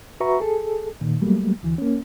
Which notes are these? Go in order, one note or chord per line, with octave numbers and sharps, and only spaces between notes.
F#4 B4 E5 A#5 C#6
G#4 A4
A#2 D#3
F#3 G3 A3 A#3
D2 E3
A#3 C#4